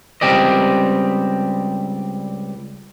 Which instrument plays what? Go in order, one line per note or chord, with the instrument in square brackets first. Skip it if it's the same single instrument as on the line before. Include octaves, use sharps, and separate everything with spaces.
[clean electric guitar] C#2 G3 C4 G4 D5 D#5